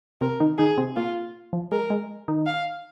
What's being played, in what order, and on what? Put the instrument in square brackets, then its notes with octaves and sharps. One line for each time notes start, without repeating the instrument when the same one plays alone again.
[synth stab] C3 C4 [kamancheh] A#4
[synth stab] D#3 D#4
[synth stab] D#3 D#4 [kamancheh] G#4
[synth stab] C3 C4
[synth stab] A#2 A#3 [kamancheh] F4
[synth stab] F3
[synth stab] G#3 [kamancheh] A#4
[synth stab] G#3
D#3 D#4
[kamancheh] F5